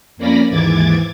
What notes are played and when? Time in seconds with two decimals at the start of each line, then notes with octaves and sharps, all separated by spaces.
0.17 F2 A#3 C#4 D5 B5 A#6
0.49 D#2 G#2 E3 D6 G#6 A6